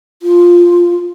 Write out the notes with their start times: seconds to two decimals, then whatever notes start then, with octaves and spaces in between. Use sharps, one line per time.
0.22 F4